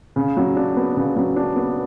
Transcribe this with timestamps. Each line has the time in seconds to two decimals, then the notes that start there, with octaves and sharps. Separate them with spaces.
0.16 C#3
0.37 F#3
0.56 D4
0.77 B3
0.96 C#3
1.16 F#3
1.36 D4
1.56 B3